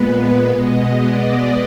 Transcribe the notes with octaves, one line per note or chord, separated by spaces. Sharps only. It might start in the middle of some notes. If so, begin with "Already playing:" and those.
Already playing: A#2 G#3 B3 B4
B2 G#3 B3 D#5
D5